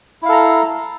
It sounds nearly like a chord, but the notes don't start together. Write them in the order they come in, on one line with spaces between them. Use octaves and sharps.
E4 F5 A4 A#5